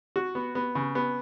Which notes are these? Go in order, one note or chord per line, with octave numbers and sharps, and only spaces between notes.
F#4
B3
B3
C#3
B3